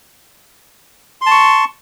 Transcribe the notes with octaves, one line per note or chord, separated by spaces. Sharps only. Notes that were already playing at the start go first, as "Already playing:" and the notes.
A5 C6 C#6